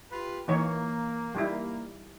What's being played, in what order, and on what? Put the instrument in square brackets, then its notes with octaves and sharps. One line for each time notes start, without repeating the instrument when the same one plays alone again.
[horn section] F4 G4 B4
[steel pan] E3 D#4 C#5 [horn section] A#3
[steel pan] G3 D#4 E4